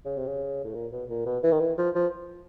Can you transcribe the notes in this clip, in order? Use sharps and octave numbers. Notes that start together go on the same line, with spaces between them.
C#3
C3
C#3
A2
A#2
B2
A#2
B2
E3
D#3
E3
F3
F3